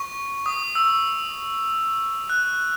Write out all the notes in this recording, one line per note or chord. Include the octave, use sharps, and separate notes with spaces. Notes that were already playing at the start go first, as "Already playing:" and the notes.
Already playing: C#6
D#6
E6
F#6